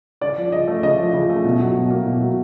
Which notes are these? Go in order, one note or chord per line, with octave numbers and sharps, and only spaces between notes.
C#3 D5
F3
C#3 D#5
A3
C#3 D#5
F3
C#3
A3
B2
F#3
B2
A#3
B2
F#3